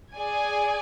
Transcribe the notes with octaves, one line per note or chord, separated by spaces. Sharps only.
G#4 D5 G#5